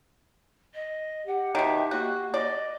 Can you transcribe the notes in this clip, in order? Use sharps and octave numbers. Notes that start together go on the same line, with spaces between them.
D#5
G4 F#5
B2 D#3 E5
A#3 F#4
D5 D#5